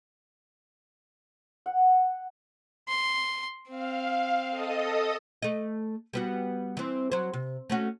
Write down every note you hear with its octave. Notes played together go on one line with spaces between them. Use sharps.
F#5
C6
C4 F5
A4 D#5 D#6
A3 D#5
G3 B3 F#4
E3 C4
F#3 C5
C3
A3 C#4 F#4